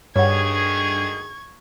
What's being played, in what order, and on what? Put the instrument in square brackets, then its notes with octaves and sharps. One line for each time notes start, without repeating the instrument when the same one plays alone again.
[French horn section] D2 D#3 G#4 [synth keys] G2 [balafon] C#5 F#5 [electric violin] C#6 G#6